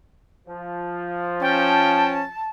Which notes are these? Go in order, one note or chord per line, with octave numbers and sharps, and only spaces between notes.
F3
C#4 G5 A5